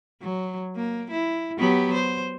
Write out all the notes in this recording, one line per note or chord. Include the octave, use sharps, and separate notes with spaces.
F#3
A#3
E4
F#3 B3 G4
C5